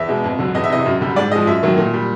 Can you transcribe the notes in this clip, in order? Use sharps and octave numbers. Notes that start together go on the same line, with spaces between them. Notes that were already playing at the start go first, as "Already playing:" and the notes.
Already playing: E2 E5
B2 G#3
F2
D3 F#3
E2 D#5
E5
C3 E3 D#5
F#2
D3 G3
G#2 D5
F3 G#3 D#5
F#2 E5
D#3 F#3 A3
A#2
G3